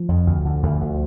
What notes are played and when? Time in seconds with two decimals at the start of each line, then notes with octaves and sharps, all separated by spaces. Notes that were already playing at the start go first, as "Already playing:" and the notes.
Already playing: F3
0.09 F2
0.27 D2
0.45 D3
0.63 D2
0.81 D2